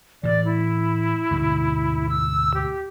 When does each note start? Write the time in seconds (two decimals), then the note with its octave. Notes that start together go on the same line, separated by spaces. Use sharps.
0.23 A2 E3 D5
0.45 E4
1.31 D2 G#2 B2
2.09 E6
2.54 G4